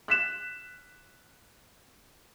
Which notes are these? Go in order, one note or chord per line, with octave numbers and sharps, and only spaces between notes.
F#6 B6 E7